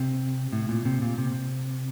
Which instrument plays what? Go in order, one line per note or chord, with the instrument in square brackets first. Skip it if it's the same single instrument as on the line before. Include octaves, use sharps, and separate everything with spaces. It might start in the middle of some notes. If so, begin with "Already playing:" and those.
Already playing: [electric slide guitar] C3
A2
A#2
C3
A#2
C3